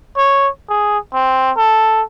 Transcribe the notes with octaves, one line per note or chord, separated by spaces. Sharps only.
C#5
G#4
C4
A4